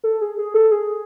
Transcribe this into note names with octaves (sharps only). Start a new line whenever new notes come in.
A4
G#4
G#4
A4
G#4